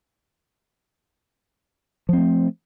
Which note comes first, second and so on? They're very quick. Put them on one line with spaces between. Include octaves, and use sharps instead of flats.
F3 C4 A3